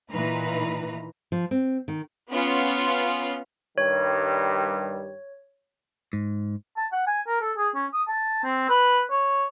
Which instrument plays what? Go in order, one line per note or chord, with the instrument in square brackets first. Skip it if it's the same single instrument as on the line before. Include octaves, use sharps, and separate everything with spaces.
[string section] A#2 D#3 E3 B4 A#5
[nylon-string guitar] F3
C4
D#3
[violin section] B3 C#4 F4
[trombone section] G2 D#3 G3 [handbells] C#5
[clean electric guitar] G#2
[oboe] A5
F#5
G#5
A#4
A4
G#4
C#4
D#6
A5
C4
B4
C#5